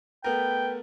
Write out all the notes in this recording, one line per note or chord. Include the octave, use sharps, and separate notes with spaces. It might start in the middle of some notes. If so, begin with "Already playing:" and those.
A3 B3 A#4 B4 G5